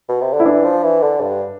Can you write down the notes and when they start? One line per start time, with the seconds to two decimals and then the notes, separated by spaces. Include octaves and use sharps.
0.09 B2
0.21 C3
0.33 D3
0.40 E4
0.45 E3 D4
0.64 F3
0.83 E3
1.02 D3
1.21 G2